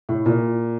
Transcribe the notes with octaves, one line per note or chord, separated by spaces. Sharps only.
A2
A#2